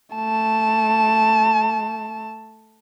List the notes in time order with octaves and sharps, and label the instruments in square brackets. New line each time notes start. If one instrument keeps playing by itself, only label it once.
[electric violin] A3 A5